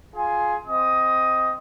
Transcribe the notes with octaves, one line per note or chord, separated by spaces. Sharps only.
F4 G#4 G#5
C4 D#5 D#6